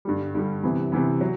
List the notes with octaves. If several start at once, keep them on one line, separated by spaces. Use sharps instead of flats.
G2 D3 G3
G2 D3 G3
C3 E3 B3
C3 E3 B3
F#3